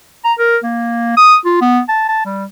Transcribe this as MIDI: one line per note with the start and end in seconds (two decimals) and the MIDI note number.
0.24 0.33 82
0.39 0.57 70
0.64 1.17 58
1.17 1.37 87
1.45 1.57 65
1.61 1.80 59
1.89 2.05 81
2.09 2.25 81
2.25 2.45 55